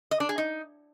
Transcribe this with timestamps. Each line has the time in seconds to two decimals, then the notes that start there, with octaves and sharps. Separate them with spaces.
0.11 D#5
0.20 D4
0.29 G#4
0.38 D#4